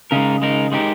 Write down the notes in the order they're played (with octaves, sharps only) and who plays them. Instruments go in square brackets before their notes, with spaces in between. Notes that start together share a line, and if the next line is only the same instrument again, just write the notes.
[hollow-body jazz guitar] C#3 [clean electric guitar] G#3 D#4 A#4
[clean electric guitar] G#3 D#4 A#4
G#3 D#4 G4 A#4